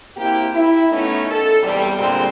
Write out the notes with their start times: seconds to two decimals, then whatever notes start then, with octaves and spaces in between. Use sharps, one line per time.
0.17 A#3 C4 E4 G4
0.54 E4
0.92 A3 B3 C#4 D#4
1.31 A4
1.64 E2 C3 G3
1.98 A#2 D3 G3 G#3 C4